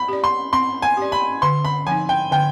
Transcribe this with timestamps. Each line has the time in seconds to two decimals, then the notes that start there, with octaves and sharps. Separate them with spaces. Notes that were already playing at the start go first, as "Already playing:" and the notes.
Already playing: B5
0.08 G4 D5
0.24 C6
0.53 C4 C6
0.82 G#5
0.97 G4 D5
1.12 B5
1.42 D3 C6
1.64 B5
1.87 F3 C4 D#4 G#5
2.09 G5
2.31 D3 G5